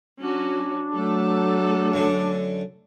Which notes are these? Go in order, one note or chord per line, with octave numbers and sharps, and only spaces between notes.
F#3 C#4 D4 F#4
F#3 A3 A4
F#2 D3